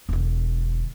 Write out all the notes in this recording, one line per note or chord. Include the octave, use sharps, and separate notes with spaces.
E1 D3